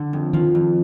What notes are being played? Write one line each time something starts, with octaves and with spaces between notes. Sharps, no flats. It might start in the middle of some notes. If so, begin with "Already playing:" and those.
Already playing: D3
F2
D#3 F3
F2